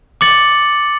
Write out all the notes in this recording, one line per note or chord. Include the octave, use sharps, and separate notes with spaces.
D6 A6 C#7 F#7